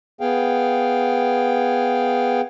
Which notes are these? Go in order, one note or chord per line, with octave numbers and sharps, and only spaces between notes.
B3 G#4 F5 G5